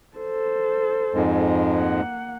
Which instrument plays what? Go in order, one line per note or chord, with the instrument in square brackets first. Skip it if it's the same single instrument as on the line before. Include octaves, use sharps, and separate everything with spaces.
[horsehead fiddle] A4 C5
[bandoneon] F2 G#2 G#3
[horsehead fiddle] A#3 F#5